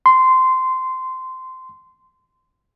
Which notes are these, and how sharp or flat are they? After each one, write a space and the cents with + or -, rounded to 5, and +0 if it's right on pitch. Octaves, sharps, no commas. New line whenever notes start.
C6 -15